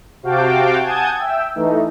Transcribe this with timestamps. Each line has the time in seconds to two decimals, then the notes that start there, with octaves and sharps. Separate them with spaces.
0.23 C3 F#4 F5 G5 A5 D6
0.83 F#5 G#5 A5 D#6 G6 G#6
1.18 E5 G5 E6
1.55 E3 A3 D#4